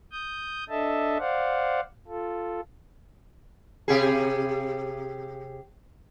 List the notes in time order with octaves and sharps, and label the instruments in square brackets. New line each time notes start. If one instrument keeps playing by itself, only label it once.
[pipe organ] D#6 G6
D4 A4 D#5 E5 A5
C5 D5 F5 F#5
F4 A4
[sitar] C3 G4 G#4